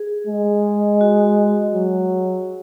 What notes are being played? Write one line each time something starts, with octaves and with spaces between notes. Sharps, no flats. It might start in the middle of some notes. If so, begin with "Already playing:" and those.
Already playing: G#4
G#3
F#4
F#3